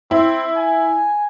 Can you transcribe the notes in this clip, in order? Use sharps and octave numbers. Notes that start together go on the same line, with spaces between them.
C4 E4
G#5